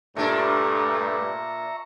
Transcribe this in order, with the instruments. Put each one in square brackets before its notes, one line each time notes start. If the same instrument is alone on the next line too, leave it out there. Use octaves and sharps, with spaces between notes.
[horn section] G2 [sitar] A#2 D4 [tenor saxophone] A3 [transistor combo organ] E5 A#5 C#6